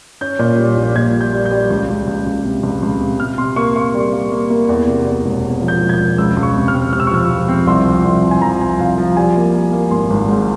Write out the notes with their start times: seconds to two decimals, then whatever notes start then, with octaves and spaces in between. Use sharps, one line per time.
0.21 C#4 G6
0.39 A#2
0.58 G3
0.77 A#1
0.96 A#2 G#6
1.14 G3
1.21 G6
1.33 G3
1.45 G6
1.51 G3
1.70 C#2
1.89 C#2
2.07 C#2
2.26 C#2
2.45 C3
2.63 C#2
2.83 C#2
3.00 C3
3.20 C3 F6
3.38 C3 C6
3.56 A#3 C#6
3.76 A#3 C#6
3.94 G3
4.13 A#3
4.32 A#3
4.50 A#3
4.69 E2
4.87 C3
5.06 E2
5.25 E1
5.44 E2
5.62 F3
5.68 G6
5.81 E1
5.89 G#6
5.93 G6
6.00 E1
6.18 C#2 E6
6.37 C#2
6.43 C#6
6.56 C3
6.68 F6
6.74 C4
6.93 C3 F6
7.00 E6
7.07 C#6
7.11 F3 E6
7.31 F3
7.49 C4
7.67 C2 C6
7.86 F3
8.04 C2
8.24 C2
8.31 G#5
8.42 F3 A#5
8.61 C2 G#5
8.79 C2 F5
8.98 F3
9.17 G3 G#5
9.36 A#3
9.54 A#3
9.73 A#3
9.91 G#1 C6
10.10 G#1
10.28 G#2